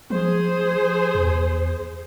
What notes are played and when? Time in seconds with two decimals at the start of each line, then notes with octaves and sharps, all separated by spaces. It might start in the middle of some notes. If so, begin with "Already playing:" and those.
0.10 F3 G#4 C5
1.15 E2